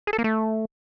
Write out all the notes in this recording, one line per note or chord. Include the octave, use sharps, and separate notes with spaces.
G#4
A4
A#3
A3